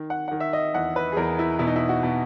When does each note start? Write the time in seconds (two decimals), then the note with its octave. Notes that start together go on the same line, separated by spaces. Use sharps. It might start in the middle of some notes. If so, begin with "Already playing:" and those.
Already playing: D#3
0.10 F#5
0.28 D#3 F#5
0.40 E5
0.53 D#5
0.74 E2 F#5
0.96 B4
1.12 G#4
1.17 E2 A#4
1.39 E4
1.59 B2 E4
1.67 D#4
1.76 E4
1.89 F#4
2.03 B2